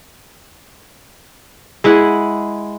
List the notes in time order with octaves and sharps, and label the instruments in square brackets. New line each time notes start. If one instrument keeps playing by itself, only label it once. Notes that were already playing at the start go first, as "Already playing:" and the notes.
[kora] G#3 E4 G#4 F#5